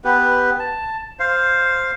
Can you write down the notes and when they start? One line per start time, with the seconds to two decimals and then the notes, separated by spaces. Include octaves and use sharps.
0.04 B3 G4 B4
0.59 A5
1.19 C5 F5